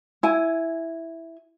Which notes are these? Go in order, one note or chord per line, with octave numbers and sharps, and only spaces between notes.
E4 G#5